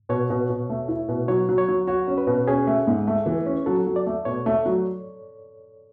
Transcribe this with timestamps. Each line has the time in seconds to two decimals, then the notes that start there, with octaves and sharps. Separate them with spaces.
0.09 B2 C#5
0.30 B2
0.50 B2
0.70 A3
0.88 E4
1.08 B2
1.28 F#3 C#5
1.49 F#3
1.58 C#5
1.68 F#3
1.87 F#4 C#5
2.07 C#4
2.18 B4
2.27 B2
2.47 C#4 G#4
2.67 A3
2.87 G#2
3.07 A3
3.26 E3
3.46 C#4
3.66 F#3 A4
3.87 F#3
3.96 D5
4.06 A3
4.25 B2 C#5
4.46 A3
4.66 F#3